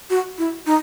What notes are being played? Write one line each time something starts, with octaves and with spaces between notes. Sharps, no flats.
F#4
E4
D#4